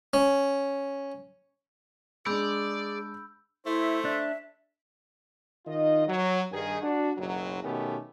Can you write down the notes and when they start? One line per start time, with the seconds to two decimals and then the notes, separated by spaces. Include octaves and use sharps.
0.14 C#4
2.26 G#3 D4 G#4 D5 B5 E6 G6
3.66 A3 E4 C5
4.05 D4 E5
5.67 D#3 D#4 F4 D#5
6.08 F#3
6.52 G2 D#3 G#4
6.82 D4 F#4
7.17 F#1 B1 F#3
7.64 B2 D#3 A3 B3 C#4 G4